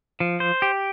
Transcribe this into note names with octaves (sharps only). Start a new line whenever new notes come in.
F3
C5
G4